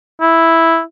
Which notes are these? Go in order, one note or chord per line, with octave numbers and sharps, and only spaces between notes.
E4